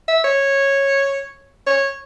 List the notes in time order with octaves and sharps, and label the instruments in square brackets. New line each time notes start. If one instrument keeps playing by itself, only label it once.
[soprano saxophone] E5
C#5
C#5